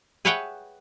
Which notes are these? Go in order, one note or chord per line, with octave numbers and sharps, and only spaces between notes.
G#4 B4 C#5 E5 F#5 G5